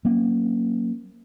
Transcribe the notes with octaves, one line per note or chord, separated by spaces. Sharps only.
F#3 A#3 C4 C#4